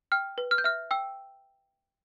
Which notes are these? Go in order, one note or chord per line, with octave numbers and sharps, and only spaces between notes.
G5 F6
B4
F6
G6
E5 F6
G5 E6